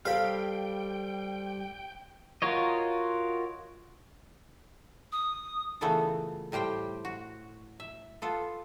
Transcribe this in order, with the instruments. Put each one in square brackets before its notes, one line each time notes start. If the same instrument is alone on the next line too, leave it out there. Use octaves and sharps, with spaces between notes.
[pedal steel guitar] G3 F6 [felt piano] A4 C5 [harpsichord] F5 B5 [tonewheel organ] G5
[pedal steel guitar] F4 F#4 A#4 C#5 D#5
[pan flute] D#6
[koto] A#2 C#3 E3 A3 B3 A4
A2 G3 G4 C5 G5
F#4
E5
B3 F4 A4